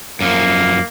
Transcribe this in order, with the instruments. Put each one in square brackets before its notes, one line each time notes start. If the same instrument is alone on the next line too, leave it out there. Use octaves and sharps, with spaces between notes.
[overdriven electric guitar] F#2 F3 [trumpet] A#3